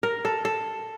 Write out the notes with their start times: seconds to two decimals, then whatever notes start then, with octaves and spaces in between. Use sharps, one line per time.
0.03 A#4
0.25 A4
0.45 A4